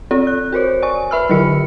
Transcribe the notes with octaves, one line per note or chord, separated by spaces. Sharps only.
C4 F4 A4 D5
F#6
F#4 A#4 C5 C#5
D5 G#5 C#6
B4 E5 B5 E6 F6
D3 D#3 F#3 F4 A#4 C#7